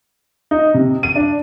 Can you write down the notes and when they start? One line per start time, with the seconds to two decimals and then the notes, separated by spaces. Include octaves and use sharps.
0.51 D#4
0.74 C3
1.03 D#7
1.16 D4